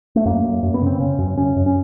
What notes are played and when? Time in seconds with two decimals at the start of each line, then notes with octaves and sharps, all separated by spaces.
0.16 A3
0.25 F#2 A#3
0.44 F#2
0.63 F#2
0.74 B3
0.82 C#3 C4
1.00 C#3 C#4
1.18 F#2
1.37 F#2 C#4
1.56 F#2
1.66 C#4